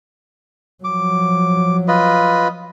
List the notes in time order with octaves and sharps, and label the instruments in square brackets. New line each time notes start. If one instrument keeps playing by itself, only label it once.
[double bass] F3 F#3 [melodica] D6
[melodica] F4 B4 D#5